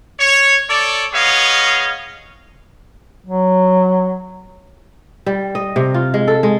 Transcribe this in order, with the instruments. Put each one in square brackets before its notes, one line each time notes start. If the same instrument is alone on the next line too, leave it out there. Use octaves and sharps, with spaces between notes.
[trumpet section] C#5
A4 C#5 D5
B3 G#4 C#5 D#5 F5
[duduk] F#3
[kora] G3
D#5
C3
F4
G#3
A4
G#3